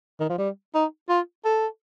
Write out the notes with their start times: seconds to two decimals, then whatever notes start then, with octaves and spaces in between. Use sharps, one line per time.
0.20 D#3
0.30 F3
0.38 G3
0.74 D#4
1.09 F4
1.45 A4